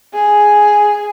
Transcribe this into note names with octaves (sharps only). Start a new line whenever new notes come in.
G#4